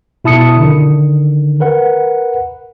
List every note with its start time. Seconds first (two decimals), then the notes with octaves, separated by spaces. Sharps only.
0.24 B2 E4 A5 D#6 C#7
0.57 D3 D#3
1.60 A#4 B4 F#5